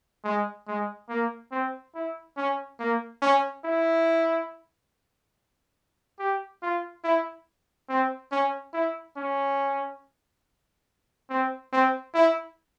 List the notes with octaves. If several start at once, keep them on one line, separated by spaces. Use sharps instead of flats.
G#3
G#3
A#3
C4
E4
C#4
A#3
C#4
E4
G4
F4
E4
C4
C#4
E4
C#4
C4
C4
E4